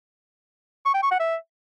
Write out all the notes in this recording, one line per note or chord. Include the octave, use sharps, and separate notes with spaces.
C#6
G5
C#6
F#5
E5